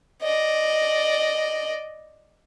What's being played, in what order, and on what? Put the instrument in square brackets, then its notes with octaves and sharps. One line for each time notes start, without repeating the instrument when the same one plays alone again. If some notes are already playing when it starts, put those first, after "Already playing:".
[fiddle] D5 D#5